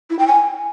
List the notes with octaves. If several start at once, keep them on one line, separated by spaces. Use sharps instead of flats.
E4
G5
G#5